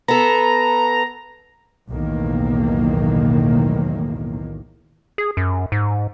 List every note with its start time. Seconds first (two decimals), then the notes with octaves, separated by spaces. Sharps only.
0.08 B3 A4 A#5
1.89 B1 E2 A2 D#3 A#3
5.18 G#4
5.37 F#2
5.72 G#2